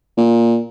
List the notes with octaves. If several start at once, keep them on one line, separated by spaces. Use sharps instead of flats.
A#2